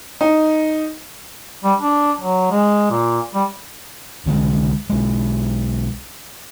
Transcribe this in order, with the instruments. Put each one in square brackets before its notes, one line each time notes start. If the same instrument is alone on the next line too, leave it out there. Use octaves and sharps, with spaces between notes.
[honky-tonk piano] D#4
[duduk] G3
D4
F#3
G#3
A#2
G3
[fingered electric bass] C2 D3 F#3 G#3
B1 G#3